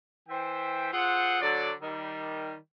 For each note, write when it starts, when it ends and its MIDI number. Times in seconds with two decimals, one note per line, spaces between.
0.29 0.89 52
0.29 0.89 72
0.29 0.89 76
0.29 0.89 79
0.92 1.39 65
0.92 1.39 68
0.92 1.39 69
0.92 1.39 72
0.92 1.39 78
1.41 1.71 50
1.41 1.71 54
1.41 1.71 74
1.81 2.54 51
1.81 2.54 55